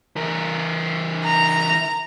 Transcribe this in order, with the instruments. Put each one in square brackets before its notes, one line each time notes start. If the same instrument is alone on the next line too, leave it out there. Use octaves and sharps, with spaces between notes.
[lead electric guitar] E3 A#4
[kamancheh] A#5